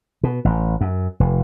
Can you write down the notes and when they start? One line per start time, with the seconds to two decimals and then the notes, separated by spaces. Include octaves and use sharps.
0.24 B2
0.45 A1
0.81 F#2
1.20 F1